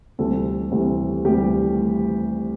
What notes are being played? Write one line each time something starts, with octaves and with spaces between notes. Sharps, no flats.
D2 C3 E3 G3 A4
D2 C3 E3 G3
D2 C3 E3 G3 G4